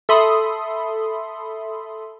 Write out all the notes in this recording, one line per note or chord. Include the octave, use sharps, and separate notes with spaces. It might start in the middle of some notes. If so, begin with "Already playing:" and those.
A4 E5 B5 C6 D#6